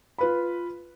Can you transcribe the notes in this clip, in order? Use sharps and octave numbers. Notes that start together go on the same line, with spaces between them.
F4 B4 B5